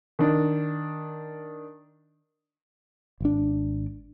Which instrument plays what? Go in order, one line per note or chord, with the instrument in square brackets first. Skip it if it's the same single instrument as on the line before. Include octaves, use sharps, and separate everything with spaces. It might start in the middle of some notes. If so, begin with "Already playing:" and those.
[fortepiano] D#3 D4
[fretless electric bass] G#1 D4